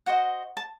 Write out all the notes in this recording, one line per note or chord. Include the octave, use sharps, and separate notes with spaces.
F#4 C5 D#5 F#5
A5